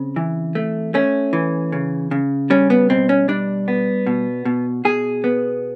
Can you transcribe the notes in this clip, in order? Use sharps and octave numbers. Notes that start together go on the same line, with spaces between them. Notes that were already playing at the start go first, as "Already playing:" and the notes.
Already playing: C#3 C4
E3
A3
A3 C#4
E3
C#3
C#3
G3 C#4
B3
B2 C4
C#4
G3 D4
B3
B2
B2
B2 G#4
B3